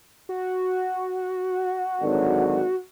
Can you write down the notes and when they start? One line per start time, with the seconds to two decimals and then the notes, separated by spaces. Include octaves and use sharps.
0.29 F#4
2.02 G#1 D3 F#3